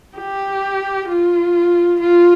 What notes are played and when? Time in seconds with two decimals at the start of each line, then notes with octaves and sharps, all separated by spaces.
0.18 G4
1.08 F4
2.00 F4